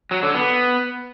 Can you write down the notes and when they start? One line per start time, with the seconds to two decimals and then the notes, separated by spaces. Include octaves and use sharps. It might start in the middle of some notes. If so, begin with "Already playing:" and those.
0.11 F#3
0.23 D3
0.35 B3